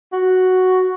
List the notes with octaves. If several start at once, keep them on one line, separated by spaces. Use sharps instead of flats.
F#4